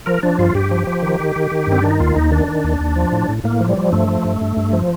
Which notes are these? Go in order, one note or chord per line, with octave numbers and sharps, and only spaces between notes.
F3 A#4
F3 D4
G2 F4
G2 G4
F3
F3
D#3
D#3
D#3
D#3
G2
C4
D#3 D4
D#4
D#2 F4
D#2 D#4
D#3 D4
D#3
D#2
D#2
F3
A2
A2
A2 A#3
F3
G3
F3
G2 A3
F3
G2
G2
G2
F3